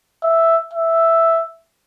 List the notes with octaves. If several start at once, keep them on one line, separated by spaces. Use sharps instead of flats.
E5
E5